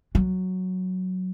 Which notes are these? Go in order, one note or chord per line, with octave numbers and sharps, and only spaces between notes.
F#3